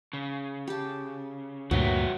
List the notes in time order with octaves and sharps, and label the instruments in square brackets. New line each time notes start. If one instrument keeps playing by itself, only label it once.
[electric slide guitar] C#3
[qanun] G4 A5
[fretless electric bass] D2 G2 A#2 [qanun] F#3 [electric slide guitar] F#4 B4 E5